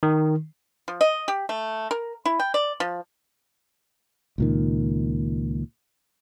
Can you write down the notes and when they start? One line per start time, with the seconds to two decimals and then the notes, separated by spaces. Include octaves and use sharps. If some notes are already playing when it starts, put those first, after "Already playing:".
0.03 D#3
0.88 F3
1.01 D#5
1.28 G4
1.49 A3
1.91 A#4
2.26 E4
2.40 G5
2.54 D5
2.80 F3
4.38 C#2 A#2 D#3